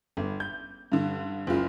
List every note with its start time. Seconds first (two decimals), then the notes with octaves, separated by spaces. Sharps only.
0.17 G1
0.40 G6
0.92 G2 D3
1.47 F#1 C#2 F4